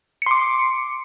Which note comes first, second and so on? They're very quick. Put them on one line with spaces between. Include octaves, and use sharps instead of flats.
C#7 C6 D6